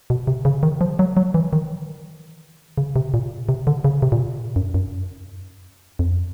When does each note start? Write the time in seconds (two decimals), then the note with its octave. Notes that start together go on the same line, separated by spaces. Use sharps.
0.10 B2
0.27 C3
0.45 C#3
0.63 D#3
0.81 F3
0.99 F#3
1.17 F#3
1.34 E3
1.53 D#3
2.78 C#3
2.96 C3
3.14 A#2
3.49 C3
3.67 D3
3.85 C#3
4.02 C3
4.12 A#2
4.20 B2
4.56 F#2
4.74 F#2
5.99 F2